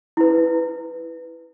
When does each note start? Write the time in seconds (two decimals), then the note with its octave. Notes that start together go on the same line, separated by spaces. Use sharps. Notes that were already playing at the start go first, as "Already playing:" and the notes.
0.17 E4 B4